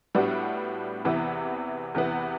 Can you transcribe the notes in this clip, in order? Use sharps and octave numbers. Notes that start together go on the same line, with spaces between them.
A2 G3 B3 D4 F#4
E2 C3 E3 B3
E2 C3 E3 B3